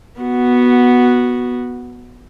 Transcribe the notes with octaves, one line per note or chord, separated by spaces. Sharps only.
B3 F#4